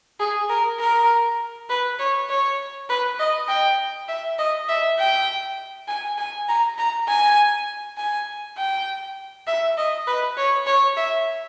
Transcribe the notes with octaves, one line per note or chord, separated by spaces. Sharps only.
G#4
A#4
A#4
B4
C#5
C#5
B4
D#5
G5
E5
D#5
E5
G5
G#5
G#5
A#5
A#5
G#5
G#5
G5
E5
D#5
B4
C#5
C#5
E5